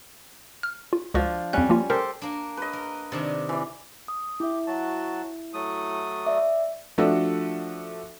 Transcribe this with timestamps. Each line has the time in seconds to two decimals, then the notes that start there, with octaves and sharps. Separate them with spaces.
0.63 F6
0.93 F4
1.14 C#2 F3 D4 F#4
1.53 F2 G3 C#4 F#6
1.69 F3 A#3 F4
1.90 G4 A4 A#4 C5
2.22 A#3 D4 F#4 A#4
2.57 B4 D#5
2.73 C#3 B3 A#4 C#5
3.12 C3 D#3 D4 D5 G#5
3.49 E3 F#3 D5
4.08 D#6
4.40 E4 G4 E5
4.67 F#3 F#4 A5
5.54 F#3 A3 D#6
6.25 D5 E5 D6
6.98 F3 A3 D4 F#4 A4